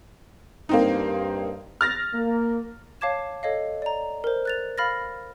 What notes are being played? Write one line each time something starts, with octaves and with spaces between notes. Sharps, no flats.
G2 A#3 C4 D#4
F6 A6 A#6
A#3
C#5 F5 A5 D6 G#6 E7
A4 C#5 D#5 F5
D5 A#5
A#4 C5
F#6 A6 F7
F5 B5 F6 A6 A#6